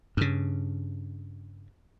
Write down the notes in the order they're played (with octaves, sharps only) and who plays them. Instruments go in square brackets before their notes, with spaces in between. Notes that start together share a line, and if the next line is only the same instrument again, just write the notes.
[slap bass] G2 C#3